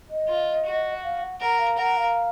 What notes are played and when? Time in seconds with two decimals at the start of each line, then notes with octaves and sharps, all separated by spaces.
0.10 D#5
0.28 F4
0.66 F#4
1.03 F5
1.22 F#5
1.40 A#4 F#5
1.59 F5
1.78 A#4 F#5
1.97 F5